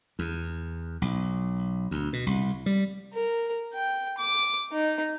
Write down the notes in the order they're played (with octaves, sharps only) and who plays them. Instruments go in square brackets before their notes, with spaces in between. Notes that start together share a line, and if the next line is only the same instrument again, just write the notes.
[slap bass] E2
B1
D2
B2
C2
G3
[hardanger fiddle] A#4
G5
D6
D#4